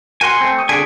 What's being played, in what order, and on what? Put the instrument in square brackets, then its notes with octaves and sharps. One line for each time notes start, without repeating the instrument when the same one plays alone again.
[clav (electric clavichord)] F#4 A#4 F#5 [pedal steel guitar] G#5 C6 [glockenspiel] C#7
[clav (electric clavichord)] A3 C4
[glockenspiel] C#6 D#6 D#7
[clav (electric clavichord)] D3 G#4 [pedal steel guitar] C4 G#5 [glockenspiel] B6 D7